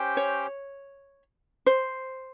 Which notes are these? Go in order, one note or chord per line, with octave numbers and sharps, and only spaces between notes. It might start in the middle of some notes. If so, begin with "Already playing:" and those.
Already playing: C#4 G4 C5 G5
C#5
C5